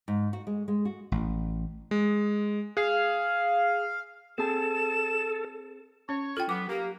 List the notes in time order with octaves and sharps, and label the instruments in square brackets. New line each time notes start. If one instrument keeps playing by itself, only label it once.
[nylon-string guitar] G#2
F#4
G#3
G#3
F#4
[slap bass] A1
[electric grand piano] G#3
[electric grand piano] G#4 [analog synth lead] F5
[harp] C4 G#4 A5 [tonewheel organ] A4 [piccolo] E7
[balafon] C#4 [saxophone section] C#5
[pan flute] F4 [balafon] A4 G5
[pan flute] F#3 [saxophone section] B3 [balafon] D6
[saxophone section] A#3 [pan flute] G4